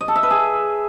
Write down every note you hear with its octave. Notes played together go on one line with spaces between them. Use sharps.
D#5
A4
E5
B4
G#4